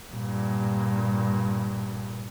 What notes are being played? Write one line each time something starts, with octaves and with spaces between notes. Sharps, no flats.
G2 A#2